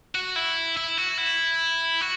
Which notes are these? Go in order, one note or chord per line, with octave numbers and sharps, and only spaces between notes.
F#4
E4
E4
F#4
E4
F#4